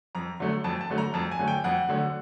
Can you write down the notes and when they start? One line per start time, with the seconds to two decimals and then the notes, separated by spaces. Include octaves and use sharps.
0.15 F2 A#5
0.40 D3 F#3 A3
0.64 F2 A5
0.81 A5
0.90 D3 F#3 A3
0.98 A#5
1.14 F2 A5
1.31 G#5
1.39 D3 F#3 A3
1.48 G5
1.64 F2 F#5
1.89 D3 F#3 A3